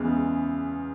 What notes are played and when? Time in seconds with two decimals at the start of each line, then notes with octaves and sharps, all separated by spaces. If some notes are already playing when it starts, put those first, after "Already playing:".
Already playing: E2 C#3 E3 G#3